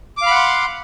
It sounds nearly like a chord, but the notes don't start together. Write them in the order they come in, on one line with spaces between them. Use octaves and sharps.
D6 F5 B5 F#5 C6